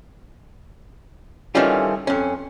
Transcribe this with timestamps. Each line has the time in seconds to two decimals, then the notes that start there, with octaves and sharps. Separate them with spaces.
1.55 D#3 E3 G3 A3 C#4 F4
2.07 F2 C#4